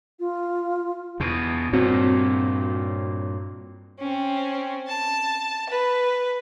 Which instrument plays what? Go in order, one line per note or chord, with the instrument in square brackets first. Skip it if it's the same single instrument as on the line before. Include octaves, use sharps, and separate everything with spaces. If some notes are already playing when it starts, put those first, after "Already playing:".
[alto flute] F4
[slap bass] E2 B2
[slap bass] G2 A#2 [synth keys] C4 F#4 C#5
[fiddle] C4 C#4
A5
B4